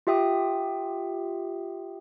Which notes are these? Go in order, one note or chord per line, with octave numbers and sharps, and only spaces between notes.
F4 G4 E5 G5 D#6